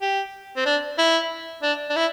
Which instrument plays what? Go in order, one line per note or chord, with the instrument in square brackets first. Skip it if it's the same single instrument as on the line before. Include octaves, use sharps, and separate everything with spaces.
[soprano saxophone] G4
C4
D4
E4
D4
D4
E4